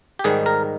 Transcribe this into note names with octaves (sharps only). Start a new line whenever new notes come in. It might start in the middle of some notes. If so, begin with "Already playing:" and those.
G4
G#2 D#3 G3 G#4
A#4